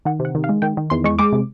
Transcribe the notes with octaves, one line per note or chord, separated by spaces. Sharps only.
D#3 F#5
C3
F#5
D#3
F5
G#3
D#3 G5
D#3
E2 C6
G#3 C#6
G#3 D6
C3